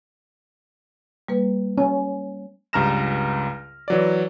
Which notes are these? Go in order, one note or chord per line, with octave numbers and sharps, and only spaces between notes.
G3 A#3 B4
C#4 C#5 G#5
C#2 G2 A#5 F6 A#6 E7
E3 F#3 D5